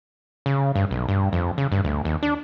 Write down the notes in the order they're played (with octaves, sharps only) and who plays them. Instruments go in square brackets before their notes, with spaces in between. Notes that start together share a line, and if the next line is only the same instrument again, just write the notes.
[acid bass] C#3
G2
B1
G2
F2
C#3
G2
D2
D#2
D4